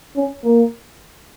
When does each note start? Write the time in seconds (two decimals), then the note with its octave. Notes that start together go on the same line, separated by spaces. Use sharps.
0.17 C#4
0.44 A#3